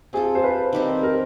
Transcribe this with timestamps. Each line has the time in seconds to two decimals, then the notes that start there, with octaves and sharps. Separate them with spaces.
0.13 C4 F4 G#4 A4
0.35 C5
0.44 B4
0.73 D#3 G3 C4
1.03 A#4